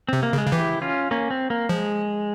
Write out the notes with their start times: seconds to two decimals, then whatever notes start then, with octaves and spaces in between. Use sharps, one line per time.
0.09 C3 C4
0.23 A#3
0.33 C#3 G#3
0.47 C#3
0.52 E3 E4 G4
0.82 C#4 F4
1.11 A#3 C#4
1.31 C4
1.50 A#3
1.69 F3 G#3